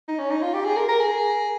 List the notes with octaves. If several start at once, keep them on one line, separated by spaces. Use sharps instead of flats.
D#4
C#4
D#4
F4
G4
G#4
A#4
A#4
G#4